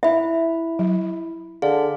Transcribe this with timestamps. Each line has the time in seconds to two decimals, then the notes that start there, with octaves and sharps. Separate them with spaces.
0.03 E4 E5 B5
0.79 F#3
1.62 D3 G#4 F5